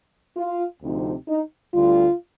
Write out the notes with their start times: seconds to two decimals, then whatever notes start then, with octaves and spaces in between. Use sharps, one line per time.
0.37 F4
0.82 D2 C3 F3 C4 D#4
1.28 D#4
1.74 D2 D3 G3 F4